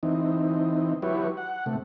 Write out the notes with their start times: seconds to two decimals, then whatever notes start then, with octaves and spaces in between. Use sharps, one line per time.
0.03 E3 C4 D#4
1.02 F#3 E4 G4 B4 C#5
1.37 F#5
1.66 C3 A3